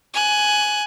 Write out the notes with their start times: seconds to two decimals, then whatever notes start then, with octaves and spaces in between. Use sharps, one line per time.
0.14 G#5 F#6